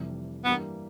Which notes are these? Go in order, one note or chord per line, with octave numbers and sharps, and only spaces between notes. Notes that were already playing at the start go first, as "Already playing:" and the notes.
Already playing: F1 F2 C3 E3 G3
G2 E3 G3 A#3 B3